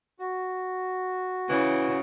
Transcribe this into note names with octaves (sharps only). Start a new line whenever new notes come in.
F#4
C#3 E3